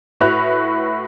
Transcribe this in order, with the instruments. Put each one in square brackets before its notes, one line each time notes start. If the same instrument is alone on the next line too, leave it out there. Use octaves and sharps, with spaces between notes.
[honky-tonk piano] A2 F#4 B4 E5 F#6 F7